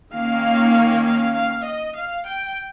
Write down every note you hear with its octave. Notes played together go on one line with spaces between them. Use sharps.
D#3 A#3 C#4 F5
F5
F5
D#5
F5
G5